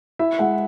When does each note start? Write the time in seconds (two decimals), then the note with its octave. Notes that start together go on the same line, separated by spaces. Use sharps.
0.19 E4 E5
0.39 G#3 F#5